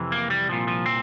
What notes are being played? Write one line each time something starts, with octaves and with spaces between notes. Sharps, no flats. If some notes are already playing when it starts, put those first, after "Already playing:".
Already playing: F2 C3 E3
A#3
G3
C2 A#2 F3
F3
C4